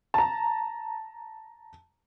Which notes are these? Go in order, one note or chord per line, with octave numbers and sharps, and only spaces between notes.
A5 A#5